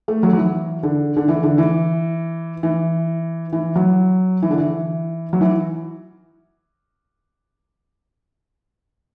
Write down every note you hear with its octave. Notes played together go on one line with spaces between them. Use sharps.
A3
F#3
F#3
E3
D3
D3
E3
D3
E3
E3
E3
F#3
E3
D3
E3
F#3
E3